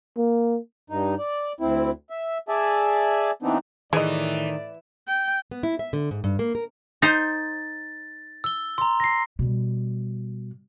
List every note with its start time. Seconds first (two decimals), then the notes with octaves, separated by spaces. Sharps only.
0.17 A#3
0.90 G2 D#4
1.18 D5
1.60 D2 C4 E4
2.10 E5
2.49 G#4 D5 E5 G#5 A5
3.42 E3 B3 C4 D4 D#4
3.93 A2 D#3 E3 G#4 D5 D#5
5.08 G5
5.51 B3
5.63 E4
5.79 E5
5.93 D3
6.11 G#2
6.24 G2
6.39 A#3
6.55 A#4
7.02 D#4 C5 A6
8.44 E6 G7
8.78 A#5 C6
9.00 A#6 C7
9.39 B2 G3